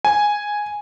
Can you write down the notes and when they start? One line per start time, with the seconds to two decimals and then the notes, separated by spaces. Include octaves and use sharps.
0.05 G#5